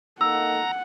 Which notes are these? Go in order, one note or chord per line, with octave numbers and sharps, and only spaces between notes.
A#3 D#4 A4 F#5 A#5 E6